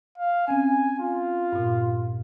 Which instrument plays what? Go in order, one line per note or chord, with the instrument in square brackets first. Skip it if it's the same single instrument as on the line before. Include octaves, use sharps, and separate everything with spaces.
[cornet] F5
[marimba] C4 C#4 [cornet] G#5
[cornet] F4
[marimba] G2 A#2